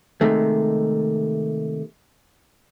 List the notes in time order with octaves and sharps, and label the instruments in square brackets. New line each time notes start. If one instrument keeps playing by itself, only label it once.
[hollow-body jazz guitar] C3 D#3 G#3 A3